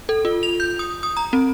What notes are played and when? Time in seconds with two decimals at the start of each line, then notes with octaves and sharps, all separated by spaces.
0.09 A4
0.25 F4
0.43 F7
0.60 G6
0.79 D#6
1.03 D#6
1.17 A#5
1.33 C4